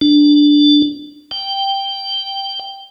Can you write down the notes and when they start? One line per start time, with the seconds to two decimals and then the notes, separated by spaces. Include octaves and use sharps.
0.01 D4
1.31 G5